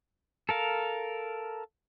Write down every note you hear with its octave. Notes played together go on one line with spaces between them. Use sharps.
A4 A#4 F5